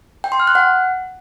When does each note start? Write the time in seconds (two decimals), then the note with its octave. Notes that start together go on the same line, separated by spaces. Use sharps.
0.24 G5
0.32 C6
0.40 F6
0.47 F#6
0.55 F#5